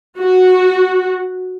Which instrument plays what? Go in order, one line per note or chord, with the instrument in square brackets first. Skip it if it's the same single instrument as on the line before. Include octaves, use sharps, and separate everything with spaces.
[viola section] F#4